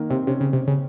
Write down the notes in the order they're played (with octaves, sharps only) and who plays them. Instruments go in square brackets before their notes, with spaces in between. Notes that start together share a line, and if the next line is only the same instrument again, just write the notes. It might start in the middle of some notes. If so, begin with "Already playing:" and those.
Already playing: [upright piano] D#3 A#3
[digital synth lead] C3 [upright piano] C4
[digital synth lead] C3 [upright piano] C#4
[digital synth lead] C#3
C3
C#3